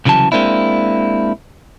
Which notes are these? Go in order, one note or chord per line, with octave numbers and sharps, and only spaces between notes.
C2 C#3 E3 F#3 A5
G#3 A#3 C4 D4 E4